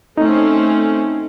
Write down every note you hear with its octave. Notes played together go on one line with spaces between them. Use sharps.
A3 C4 C#4 D#4